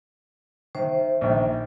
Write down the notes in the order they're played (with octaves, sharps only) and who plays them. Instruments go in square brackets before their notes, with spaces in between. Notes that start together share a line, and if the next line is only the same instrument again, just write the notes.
[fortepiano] D#3 [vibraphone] C5 E5
[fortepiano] A#1 D#3